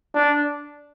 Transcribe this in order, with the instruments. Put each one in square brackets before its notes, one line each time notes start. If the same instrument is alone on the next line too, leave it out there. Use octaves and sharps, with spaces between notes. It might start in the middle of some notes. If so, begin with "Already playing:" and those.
[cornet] D4